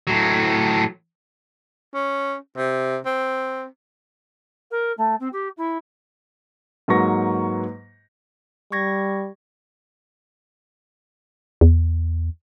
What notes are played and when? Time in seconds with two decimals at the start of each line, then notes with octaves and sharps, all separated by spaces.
0.07 A2 F#3
1.94 C#4
2.57 C3
3.05 C4
4.71 A#4
4.97 A3
5.20 C4
5.33 G4
5.57 E4
6.88 G#2 F#3 A#3 B4 C#6 A#6
8.72 G3 C#6 G#6 A#6
11.61 E2